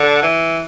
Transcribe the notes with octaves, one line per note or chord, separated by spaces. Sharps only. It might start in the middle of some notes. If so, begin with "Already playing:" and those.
Already playing: D3
E3